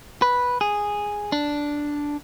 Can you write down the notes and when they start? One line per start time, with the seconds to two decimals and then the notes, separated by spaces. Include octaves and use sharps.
0.22 B4
0.61 G#4
1.32 D4